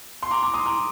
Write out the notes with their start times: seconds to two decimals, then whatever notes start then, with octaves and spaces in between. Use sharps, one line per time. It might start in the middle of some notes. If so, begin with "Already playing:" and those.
0.23 C6
0.31 A#5 D6
0.43 A#5 D6
0.54 C6 D#6
0.66 A#5 D6